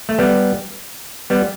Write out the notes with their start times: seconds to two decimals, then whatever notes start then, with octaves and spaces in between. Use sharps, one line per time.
0.09 A3
0.19 G3 B3
1.30 G3 B3